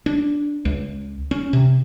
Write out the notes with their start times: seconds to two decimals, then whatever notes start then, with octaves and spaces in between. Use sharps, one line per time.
0.06 D4
0.65 C#2
1.31 C#4
1.53 C3